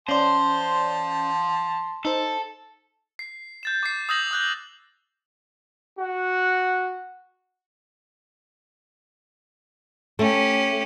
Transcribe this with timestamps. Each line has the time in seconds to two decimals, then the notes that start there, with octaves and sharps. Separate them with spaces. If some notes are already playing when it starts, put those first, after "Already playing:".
0.09 C#4 C5 D5 A5 C6
2.05 D#4 A4 C5
3.19 C7
3.63 G6 A6 E7
3.83 D6 C7
4.09 D#6 E6 G6 A#6 F#7
4.31 D#6 F#6 G6
5.97 F#4 F#5
10.19 A3 C#4 G4